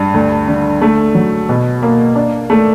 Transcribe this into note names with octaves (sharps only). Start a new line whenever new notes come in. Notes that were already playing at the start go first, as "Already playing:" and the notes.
Already playing: G2
D2
D3
A3
F#3
B2
A#3
D4
A3